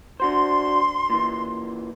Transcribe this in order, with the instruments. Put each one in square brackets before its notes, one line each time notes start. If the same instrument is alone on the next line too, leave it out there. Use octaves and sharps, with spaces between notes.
[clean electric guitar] D4 F#4 C5 [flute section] C6
[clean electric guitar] A#2 E3